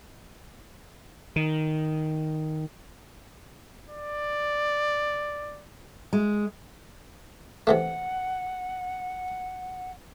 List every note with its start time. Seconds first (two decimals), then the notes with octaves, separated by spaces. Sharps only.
1.36 D#3
3.89 D5
6.13 G#3
7.67 C3 E3 A3 F#5